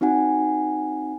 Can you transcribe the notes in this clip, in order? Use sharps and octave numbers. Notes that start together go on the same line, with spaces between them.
C4 D#4 F#4 F#5 G#5